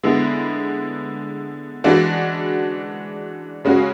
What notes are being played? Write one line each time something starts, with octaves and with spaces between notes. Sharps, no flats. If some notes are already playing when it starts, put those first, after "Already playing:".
D3 G#3 B3 E4
E3 G#3 D4 F#4
C#3 G#3 C#4 F#4